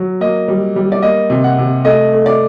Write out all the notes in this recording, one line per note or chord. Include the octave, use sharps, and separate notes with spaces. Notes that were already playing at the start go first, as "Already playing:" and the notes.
Already playing: F#3
A#3 D#5
G3
G3
D5
A#3 D#5
C3
F#5
C3
A3 D#5
A3
D5